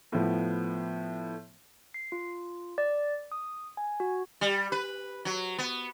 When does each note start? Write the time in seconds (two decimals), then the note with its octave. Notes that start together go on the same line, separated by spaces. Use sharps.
0.12 A2 F3 B3
1.94 C7
2.12 F4
2.78 D5
3.32 D#6
3.77 G#5
4.00 F#4
4.41 G3
4.72 B4
5.25 F#3
5.58 B3